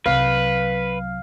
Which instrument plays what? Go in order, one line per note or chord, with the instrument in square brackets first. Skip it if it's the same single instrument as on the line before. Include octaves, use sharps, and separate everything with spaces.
[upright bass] C2 F#3 [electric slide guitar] B4 [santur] F5